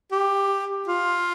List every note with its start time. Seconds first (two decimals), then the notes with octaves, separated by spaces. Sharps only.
0.12 G4
0.87 F4